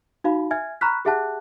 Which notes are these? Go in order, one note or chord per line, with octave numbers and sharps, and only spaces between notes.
D#4 F#4 F5 B5
E5 G#5 F6 G#6
A#5 B5 C#6 F6 F#6 B6
G4 G#4 E5 F#5 A5 F#6